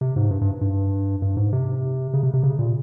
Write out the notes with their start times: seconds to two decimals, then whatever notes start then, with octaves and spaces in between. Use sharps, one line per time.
0.01 C3
0.16 G#2
0.31 G2
0.41 G2
0.61 G2
1.22 G2
1.37 G#2
1.53 C3
2.13 C#3
2.23 C3
2.34 C3
2.43 C#3
2.59 A#2